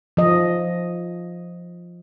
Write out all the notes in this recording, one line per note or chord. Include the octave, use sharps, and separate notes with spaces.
F3 D#5